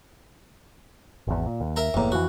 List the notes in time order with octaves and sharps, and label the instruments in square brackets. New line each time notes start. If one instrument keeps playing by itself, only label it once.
[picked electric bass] G#1 E2
A#2
D#2
[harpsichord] A#4 E5 A#5
[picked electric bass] F#1 A#3 [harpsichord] E2 A2
[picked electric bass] F2 E3 [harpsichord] F#4